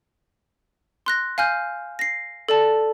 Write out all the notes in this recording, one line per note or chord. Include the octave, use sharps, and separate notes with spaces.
C6 F#6 A#6
F5 G#5 F6 G6
A#6 C7
A4 D5 A5